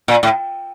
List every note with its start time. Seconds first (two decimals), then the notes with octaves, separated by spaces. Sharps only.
0.08 A#2
0.23 A2